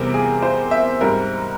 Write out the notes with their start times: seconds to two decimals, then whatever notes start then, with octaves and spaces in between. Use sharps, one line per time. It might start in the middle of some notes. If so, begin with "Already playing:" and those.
Already playing: E2 C3 G3 C4 A#4
0.14 G#4
0.43 C5
0.71 E5
1.00 G#2 G3 C4 A#4